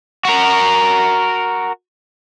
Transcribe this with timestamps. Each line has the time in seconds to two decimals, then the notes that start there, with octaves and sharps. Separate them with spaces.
0.25 F#4 A#4